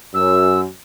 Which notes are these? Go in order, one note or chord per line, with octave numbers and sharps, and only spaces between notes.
F#2 E6